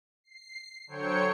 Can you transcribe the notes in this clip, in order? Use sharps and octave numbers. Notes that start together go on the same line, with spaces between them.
C7
D3 F#3 C5 C#5 G5 C#7